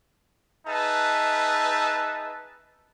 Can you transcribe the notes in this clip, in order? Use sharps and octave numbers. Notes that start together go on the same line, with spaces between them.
D#4 G#4 B4 E5 A5